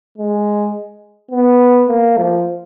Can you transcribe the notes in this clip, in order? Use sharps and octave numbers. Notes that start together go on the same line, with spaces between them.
G#3
B3
A#3
F3